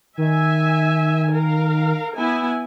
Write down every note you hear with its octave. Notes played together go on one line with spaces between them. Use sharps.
D#3 E5 G#5
A#4 F5
B3 E4 G#5